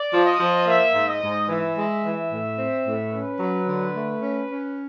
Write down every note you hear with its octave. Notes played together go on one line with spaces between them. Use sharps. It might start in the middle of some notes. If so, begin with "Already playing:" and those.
Already playing: D5
F3
D#5
F3
A#3 E5
G#2
D#5
G#2
E3 E5
G#3
E3
A2
C4
A2
C#4 B4
F#3
D3
A3
C#4
C#4